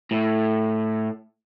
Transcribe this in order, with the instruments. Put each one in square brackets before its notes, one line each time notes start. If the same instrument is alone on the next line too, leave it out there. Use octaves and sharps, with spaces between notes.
[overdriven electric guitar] A2